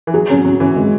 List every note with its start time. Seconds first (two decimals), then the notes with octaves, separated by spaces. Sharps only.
0.07 E3
0.14 F#3 G#4
0.30 F#3 C#4
0.44 F#3 C#4
0.60 E3 C#4
0.76 G#3